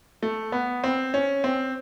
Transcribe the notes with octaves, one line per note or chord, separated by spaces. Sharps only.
A3
B3
C4
C#4
C4